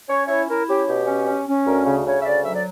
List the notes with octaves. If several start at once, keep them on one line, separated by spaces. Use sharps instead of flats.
C#4 C#5
E4 C#5
E4 A#4
C#4 G4
B2 G4
C#4
C#4
C#4
D2 A#4
C#3
C#3 C#5
E5
D2 D5
F#3 E5
D5